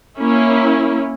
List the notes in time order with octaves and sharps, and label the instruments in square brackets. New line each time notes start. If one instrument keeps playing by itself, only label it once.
[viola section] A#3 C#4 E4